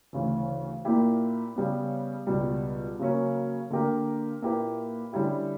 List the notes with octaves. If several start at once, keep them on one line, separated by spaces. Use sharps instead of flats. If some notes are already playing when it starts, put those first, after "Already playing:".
D2 C#3 E3
A#2 A#3 E4 G4
C#3 G3 B3
C#2 B2 G3
C#3 F#3 A#3 C#4
D3 A#3 D4 G4 A#4
A#2 A#3 E4 G4 B4
D3 G3 C#4 E4 G4